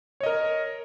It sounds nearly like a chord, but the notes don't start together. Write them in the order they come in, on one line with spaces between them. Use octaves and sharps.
C#5 D#5 A#4